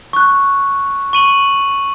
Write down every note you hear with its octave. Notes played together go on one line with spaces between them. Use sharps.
C#6 F#6
C#6 D#7 F#7